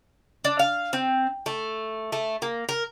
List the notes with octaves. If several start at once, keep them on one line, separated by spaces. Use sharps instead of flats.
D4
F5
C4
A3
A3
A#3
A#4